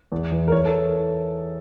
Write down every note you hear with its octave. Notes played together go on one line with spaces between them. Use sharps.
E2
E3
A#4
E3 C#5
A4